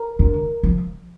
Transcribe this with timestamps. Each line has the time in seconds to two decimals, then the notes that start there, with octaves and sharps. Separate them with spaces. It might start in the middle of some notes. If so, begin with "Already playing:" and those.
Already playing: A#4
0.19 D3
0.63 F3